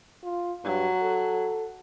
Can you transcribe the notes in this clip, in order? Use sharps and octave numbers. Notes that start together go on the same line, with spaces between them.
F4
G2 F#3
A4